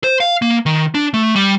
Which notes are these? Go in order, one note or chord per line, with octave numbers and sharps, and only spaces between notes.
C5
F5
A#3
D#3
D4
A3
G3